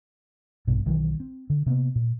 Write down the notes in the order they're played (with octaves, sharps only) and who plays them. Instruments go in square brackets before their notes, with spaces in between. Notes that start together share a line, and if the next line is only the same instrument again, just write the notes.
[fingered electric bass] A#1 G2 B2
B1 D#3 E3 F#3
C4
D3
C3 A#3 B3
A#2